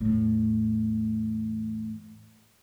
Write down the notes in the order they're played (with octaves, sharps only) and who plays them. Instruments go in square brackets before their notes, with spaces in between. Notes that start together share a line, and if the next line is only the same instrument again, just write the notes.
[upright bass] E2 A2